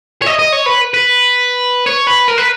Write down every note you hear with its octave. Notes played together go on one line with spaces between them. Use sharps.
C#5
D#5
D#5
C#5
B4
B4
C#5
B4
A#4
B4